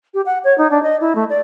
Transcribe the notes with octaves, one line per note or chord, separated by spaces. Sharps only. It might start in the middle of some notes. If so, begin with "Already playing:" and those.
G4
F#5
C#5
D#4
D4
D#5
E4
A3
D5